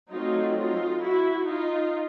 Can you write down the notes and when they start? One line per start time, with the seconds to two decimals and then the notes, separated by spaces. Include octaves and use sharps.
0.11 F#3 A3 C4 D#4 F4
0.57 D#4 F4
1.02 E4 F#4
1.47 D#4 F4